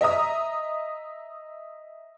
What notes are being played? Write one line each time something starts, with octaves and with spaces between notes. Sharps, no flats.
D#5 E5 A#5 D#6